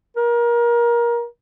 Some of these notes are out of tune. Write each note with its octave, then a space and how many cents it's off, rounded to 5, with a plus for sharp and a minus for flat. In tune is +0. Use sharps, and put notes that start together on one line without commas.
A#4 +25